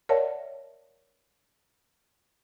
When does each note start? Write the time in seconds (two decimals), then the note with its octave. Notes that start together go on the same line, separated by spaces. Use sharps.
0.09 A#4 C#5 D5 E5 F#5 A5